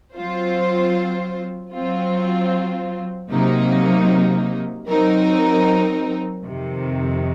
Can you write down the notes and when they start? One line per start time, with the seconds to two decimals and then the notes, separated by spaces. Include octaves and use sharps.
0.14 F#3 C4 F4 C5
1.73 F#3 C4 F4
3.30 C3 F#3 A#3 D#4
4.89 F#3 C4 D#4 A#4
6.47 F2 C3 D#3